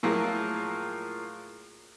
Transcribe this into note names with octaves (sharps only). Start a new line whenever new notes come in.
A2 F3 F#3 A#3 F4 G#4